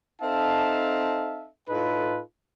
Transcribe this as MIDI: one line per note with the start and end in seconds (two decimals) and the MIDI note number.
0.22 1.49 60
0.22 1.49 63
0.22 1.49 69
0.22 1.49 76
0.22 1.49 77
0.22 1.49 81
1.69 2.21 45
1.69 2.21 63
1.69 2.21 65
1.69 2.21 69
1.69 2.21 71